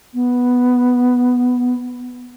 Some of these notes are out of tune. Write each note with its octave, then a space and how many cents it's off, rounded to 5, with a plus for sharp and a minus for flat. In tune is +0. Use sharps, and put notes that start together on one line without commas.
B3 +0